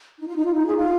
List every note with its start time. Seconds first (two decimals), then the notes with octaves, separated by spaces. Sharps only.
0.19 D#4
0.27 F4
0.37 D#4
0.45 F4
0.54 D#4
0.66 G#4
0.77 F4